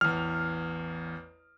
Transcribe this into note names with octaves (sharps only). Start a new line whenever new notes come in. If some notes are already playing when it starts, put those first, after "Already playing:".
A1 E2 F6